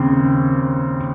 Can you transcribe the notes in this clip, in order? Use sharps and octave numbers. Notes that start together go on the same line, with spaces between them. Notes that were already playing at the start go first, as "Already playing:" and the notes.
Already playing: D#2 C#3 C4